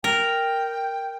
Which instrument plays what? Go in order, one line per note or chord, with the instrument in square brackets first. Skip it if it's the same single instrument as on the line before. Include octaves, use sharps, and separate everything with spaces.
[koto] A#4 [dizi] G5